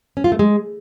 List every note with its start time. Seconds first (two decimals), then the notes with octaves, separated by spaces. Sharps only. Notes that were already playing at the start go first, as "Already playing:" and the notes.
0.17 C#4
0.24 F4
0.32 A3
0.39 G#3